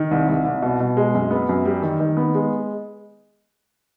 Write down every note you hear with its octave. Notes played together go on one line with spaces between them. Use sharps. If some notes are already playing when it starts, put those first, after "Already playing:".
Already playing: D#3
C2
C2
C2
B2
B2
G#3
F#2
B3
F#2
G3
D#3
D#3
B3
G#3